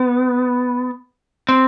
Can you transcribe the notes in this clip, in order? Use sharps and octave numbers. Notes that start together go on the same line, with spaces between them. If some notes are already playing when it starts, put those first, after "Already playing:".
Already playing: B3
C4